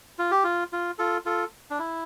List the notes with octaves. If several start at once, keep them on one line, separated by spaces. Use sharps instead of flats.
F4
G4
F4
F4
F4 A4
F4 A4
D4
E4